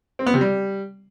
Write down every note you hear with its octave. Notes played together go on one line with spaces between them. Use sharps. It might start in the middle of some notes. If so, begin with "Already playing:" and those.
C4
B3
C3
G3